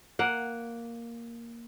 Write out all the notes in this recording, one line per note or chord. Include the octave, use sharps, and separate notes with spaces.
A#3 F#5